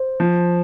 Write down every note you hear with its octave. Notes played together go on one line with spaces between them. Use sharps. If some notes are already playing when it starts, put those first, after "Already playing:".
Already playing: C5
F3